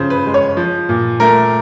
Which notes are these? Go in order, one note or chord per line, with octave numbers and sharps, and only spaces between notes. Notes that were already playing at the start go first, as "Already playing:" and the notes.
Already playing: C#3 F3 C5
B4
G#3
C#5
F3
A#2
A3 A#4